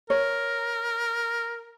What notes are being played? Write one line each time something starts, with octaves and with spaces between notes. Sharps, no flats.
A#4 C#5